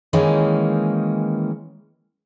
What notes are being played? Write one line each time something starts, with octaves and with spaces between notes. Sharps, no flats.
D#3 E3 G#3 A#3 C#4 D#4